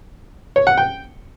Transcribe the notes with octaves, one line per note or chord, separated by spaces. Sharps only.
C#5
F#5
G5